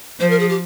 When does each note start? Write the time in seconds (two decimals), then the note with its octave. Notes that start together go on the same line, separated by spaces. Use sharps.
0.20 F3 C5
0.30 A#4
0.39 G#4
0.49 G4